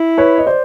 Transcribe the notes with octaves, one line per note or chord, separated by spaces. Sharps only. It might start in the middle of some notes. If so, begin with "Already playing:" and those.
Already playing: E4
B4 C#5
D#5
C5 D5